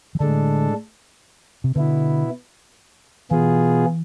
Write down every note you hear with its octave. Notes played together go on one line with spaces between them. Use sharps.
E3
A2 D3 G#3 D4 A4
C3
B2 D3 B3 E4
B2 E3 B3 F4 G#4